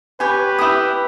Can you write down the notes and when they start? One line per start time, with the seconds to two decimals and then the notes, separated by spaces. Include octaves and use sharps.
0.20 G4 B4 C#5 G#5
0.59 E4 G4 D#6